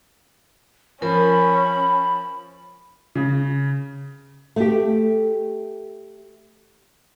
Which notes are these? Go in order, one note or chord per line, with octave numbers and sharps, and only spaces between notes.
F3 C#4 A#4 B5
C#3
A3 G4